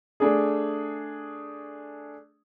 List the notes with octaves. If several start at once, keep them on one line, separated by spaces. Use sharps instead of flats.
A3 D4 G#4